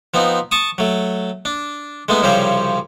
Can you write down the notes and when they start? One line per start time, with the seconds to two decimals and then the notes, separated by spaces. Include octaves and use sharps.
0.14 F3 B3 C4 D#4
0.51 A5 C#6 D#6
0.78 F#3 A3
1.45 D4
2.08 G#3 A3 B3 D#4
2.22 C2 C#3 F3 G3 C#4 C5